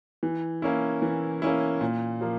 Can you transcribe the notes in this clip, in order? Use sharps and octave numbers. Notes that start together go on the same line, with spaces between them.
E3
A#3 C#4 E4
E3
A#3 C#4 E4
A#2
F3 A#3